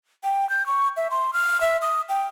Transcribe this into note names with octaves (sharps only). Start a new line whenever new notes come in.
G5
G6
C#6
E5
C6
F6
E5
D#6
G5